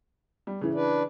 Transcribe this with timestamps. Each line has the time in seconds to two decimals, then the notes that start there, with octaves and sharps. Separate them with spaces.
0.47 G3
0.61 A2 C#3 E3
0.74 D4 B4 D5